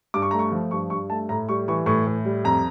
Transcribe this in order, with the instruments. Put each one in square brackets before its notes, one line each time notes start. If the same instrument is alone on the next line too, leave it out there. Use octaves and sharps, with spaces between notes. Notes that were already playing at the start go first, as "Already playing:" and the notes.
[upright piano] G2 D6
C#6
A3 A#5
C#6
F3
G2 C#6
G2 C#6
A3 A5
A2 A#5
G3 C#6
E3 C#6
A2 C#6
A2
G3
F2 A#5